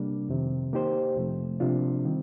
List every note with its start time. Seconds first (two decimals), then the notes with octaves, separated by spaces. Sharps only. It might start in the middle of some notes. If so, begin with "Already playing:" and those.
Already playing: C3 G3 A#3 D4
0.29 F2 C3 D#3
0.73 A#3 D#4 G4 C5
1.16 F2 C3 F3 A3
1.60 C3 F3 A#3 D4 F4
2.05 D#3 G3 C4